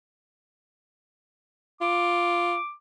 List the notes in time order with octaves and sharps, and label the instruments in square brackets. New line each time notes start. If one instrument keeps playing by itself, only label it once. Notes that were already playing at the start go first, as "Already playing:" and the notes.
[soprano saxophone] F4 [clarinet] D6